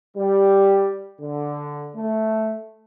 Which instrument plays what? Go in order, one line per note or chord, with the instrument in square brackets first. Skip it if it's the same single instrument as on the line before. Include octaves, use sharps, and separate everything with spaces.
[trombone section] G3
D3
A3